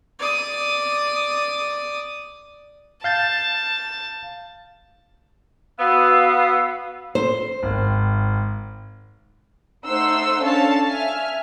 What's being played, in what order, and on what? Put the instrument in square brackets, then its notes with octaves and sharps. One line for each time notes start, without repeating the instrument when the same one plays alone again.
[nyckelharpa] D5 D#6
[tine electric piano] F5 G6 A6 [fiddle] A5
[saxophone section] B3 [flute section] F#4 F5 E6
[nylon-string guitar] C5
[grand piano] G#1
[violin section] A3 D#4 C5 F#5 C6 E6
C#4 D4 A4 C#5 F5 A5
E5 G#5 F6